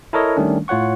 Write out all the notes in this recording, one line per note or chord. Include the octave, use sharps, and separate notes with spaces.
E4 A4 A#4 C#5 D#5
D#3 G3 A3 C#4 D4
A2 F4 C#5 F#5 C#6